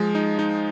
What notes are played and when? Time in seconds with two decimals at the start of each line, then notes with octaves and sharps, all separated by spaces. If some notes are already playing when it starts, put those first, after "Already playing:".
Already playing: F3 G#3
0.15 D#4
0.39 D#4